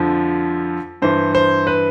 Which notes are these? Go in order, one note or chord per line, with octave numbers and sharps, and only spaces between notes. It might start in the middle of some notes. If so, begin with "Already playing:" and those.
Already playing: F2 D3 F3
G2 E3 C5
C5
B4